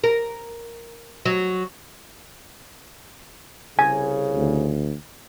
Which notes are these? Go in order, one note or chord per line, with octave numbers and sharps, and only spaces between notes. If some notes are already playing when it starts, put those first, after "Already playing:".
A#4
F#3
C2 C#3 G#5
D2